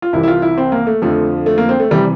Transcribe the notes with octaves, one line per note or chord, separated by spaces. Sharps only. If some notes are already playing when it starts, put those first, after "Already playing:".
F4
C2 C3 E3 E4
E4
F4
E4
C4
A#3
A3
F2 D3 F3 A3
A3
A#3
C4
A3
C3 E3 G3